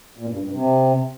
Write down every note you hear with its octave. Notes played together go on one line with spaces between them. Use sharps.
A#2
G2
G2
C3